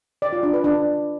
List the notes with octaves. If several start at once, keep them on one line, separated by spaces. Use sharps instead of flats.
D5
F4
D4
B4
D4